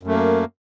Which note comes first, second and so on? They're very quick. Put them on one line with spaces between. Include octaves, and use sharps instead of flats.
F#2 A3 A#3